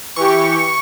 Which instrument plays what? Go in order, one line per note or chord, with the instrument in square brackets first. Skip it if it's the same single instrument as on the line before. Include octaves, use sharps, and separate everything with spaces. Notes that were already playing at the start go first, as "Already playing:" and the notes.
[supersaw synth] E3 G4 [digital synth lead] C#6